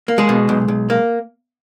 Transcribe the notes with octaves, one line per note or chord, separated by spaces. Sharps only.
A#3
G#3 G#4
B2
B1
B1
A#3